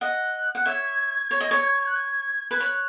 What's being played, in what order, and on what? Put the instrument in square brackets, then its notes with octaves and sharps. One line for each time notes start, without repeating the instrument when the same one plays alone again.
[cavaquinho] D#5 F#5 [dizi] F#6
[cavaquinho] F#5
[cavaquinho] C#5 E5 [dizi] G#6
[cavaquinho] C#5
D#5
C#5
[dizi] F#6
G#6
[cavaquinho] B4 [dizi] G#6
[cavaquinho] C#5 [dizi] F#6